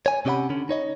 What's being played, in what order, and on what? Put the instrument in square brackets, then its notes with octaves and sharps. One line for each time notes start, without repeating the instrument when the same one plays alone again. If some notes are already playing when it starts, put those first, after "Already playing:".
[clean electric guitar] C#5 G#5
C3 C#4 G4 D5 F#5 B5
D3 C#4
D#4 C#5 D#5